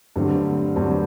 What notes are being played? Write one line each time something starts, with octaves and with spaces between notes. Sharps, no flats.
G2 D3 F#3 A3 C4
G2 D3 F#3 A3 C4